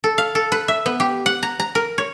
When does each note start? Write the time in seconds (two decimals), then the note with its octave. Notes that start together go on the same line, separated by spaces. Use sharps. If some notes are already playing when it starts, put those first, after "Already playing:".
0.04 A4
0.18 F5
0.35 A4
0.52 B4
0.68 E5
0.86 B3
1.00 G4
1.26 F#5
1.43 A#5
1.60 A#5
1.75 A#4
1.98 C#5